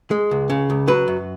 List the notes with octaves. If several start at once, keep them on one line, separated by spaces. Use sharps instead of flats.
G#3
C#2
C#3
C#2
F#3 B4
F#2